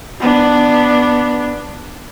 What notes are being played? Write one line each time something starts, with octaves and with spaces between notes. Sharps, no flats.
B3 D4